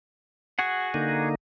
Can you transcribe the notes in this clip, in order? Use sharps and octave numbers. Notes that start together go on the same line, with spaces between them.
F#4 G#4 F#5
D3 A#3 D#4